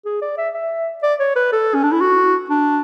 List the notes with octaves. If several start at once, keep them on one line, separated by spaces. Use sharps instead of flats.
G#4
D5
E5
E5
D5
C#5
B4
A4
C#4
D4
E4
F#4
D4